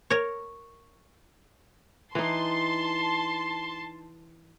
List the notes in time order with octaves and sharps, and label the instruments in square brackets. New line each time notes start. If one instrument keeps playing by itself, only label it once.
[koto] A#4 C#5
[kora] E3 D#4 [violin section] A5 C6